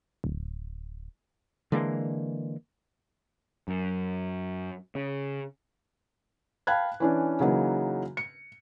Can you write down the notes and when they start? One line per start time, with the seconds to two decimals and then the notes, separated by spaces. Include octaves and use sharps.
0.24 D1
1.72 D3 E3 G#3 A#3
3.68 F#2
4.95 C#3
6.67 F5 G5 A5 B5 F#6 G#6
7.00 E3 C#4 D4
7.40 C#3 E3 F#3 A#3 D#4
8.17 C#7